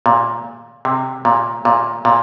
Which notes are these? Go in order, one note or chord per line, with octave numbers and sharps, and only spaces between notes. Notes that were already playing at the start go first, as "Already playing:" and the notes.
A#2
C3
A#2
A#2
A#2